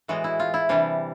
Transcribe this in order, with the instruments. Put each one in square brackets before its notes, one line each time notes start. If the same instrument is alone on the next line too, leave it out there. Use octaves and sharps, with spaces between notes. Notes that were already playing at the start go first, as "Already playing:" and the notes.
[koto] A2 E3 G#3 B3 F#4
E4
F4
E4
C3 E3 G3 D4